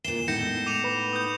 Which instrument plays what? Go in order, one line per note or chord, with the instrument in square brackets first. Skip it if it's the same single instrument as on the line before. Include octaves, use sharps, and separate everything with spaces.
[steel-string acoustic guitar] A#2 E3 [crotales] C7 E7 G7
[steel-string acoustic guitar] A2 B3 D#4 [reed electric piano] G#3 E4 [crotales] G6 A#6 C#7
[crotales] D6 D#7 F7
[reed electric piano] B4 B5 [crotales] F7
[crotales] D#6 G6